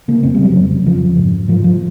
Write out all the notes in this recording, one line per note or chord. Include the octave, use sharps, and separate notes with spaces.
C#3 A#3
F2 C4
G3
C#3
F#3
F2
C#3
F2 F3
C#3
G#2
G#2 F3
F3